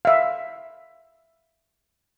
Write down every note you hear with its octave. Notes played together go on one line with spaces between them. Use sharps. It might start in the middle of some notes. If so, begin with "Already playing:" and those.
E5 F5